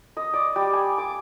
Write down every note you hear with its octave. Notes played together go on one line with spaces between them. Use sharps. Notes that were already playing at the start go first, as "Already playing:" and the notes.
D#5
D5
G3
G#5
D6